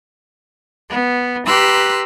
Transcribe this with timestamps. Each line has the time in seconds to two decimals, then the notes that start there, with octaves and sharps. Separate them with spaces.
0.89 B3
1.46 G4 B4 A#5 C6 E6 F#6